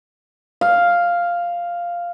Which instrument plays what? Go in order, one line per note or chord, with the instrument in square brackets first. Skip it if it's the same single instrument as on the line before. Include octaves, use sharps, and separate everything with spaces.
[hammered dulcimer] F5